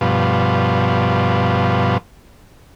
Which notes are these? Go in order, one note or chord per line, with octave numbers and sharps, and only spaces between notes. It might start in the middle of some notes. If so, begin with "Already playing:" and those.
G2 B2 F3